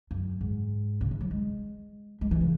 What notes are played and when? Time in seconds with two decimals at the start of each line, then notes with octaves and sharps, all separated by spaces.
0.11 F#2
0.41 G#2
1.01 C#3
1.11 E3
1.21 F#3
1.31 G#3
2.21 G#3
2.31 E3
2.41 C#3